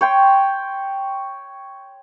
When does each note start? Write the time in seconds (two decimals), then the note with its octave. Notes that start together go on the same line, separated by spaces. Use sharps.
0.01 C#5 G5 C6